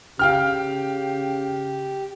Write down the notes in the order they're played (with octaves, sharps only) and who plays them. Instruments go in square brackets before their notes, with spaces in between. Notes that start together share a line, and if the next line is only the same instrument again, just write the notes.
[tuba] C#3 [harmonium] G4 [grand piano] F5 G5 F6